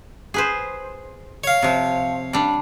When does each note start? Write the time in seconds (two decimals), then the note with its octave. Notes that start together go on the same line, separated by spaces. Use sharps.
0.34 G#4 B4 C5
1.44 C#5 F5
1.62 C3 F3
2.33 G3 D4